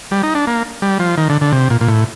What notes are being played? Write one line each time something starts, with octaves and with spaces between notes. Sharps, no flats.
G3
D#4
D4
A#3
G3
F3
D#3
D3
D3
C3
A#2
A#2
A2